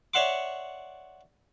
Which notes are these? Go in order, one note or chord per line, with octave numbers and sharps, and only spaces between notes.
C#5 D5 E5 F#5 C6 D6